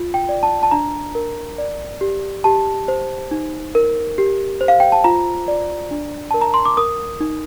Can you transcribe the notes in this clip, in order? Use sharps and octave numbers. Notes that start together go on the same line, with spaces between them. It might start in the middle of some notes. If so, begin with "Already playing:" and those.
Already playing: F4
G5
D5
A5
A5
D4 A#5
A#4
D5
G4
G4 A5
C5
D#4
A#4
G4
C5
F5
G5
A5
F4 A#5
D5
D4
A#4 A5
A#5
C6
D6
A#4 D#6
D#4